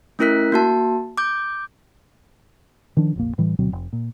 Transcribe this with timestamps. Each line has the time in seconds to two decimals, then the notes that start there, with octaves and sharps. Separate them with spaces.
0.19 A3 C#4 E4 A#4 F#6 B6
0.52 A#3 F#4 A5
1.17 D6 G6
2.97 D#3 F3 D4
3.16 F1 A#1 A#3
3.38 A2 E3 G3
3.59 D2 B2 F#3 C4
3.72 F1
3.93 A#2